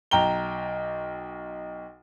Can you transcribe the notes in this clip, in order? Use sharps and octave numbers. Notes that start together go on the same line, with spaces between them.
B1 G5 A#5 G7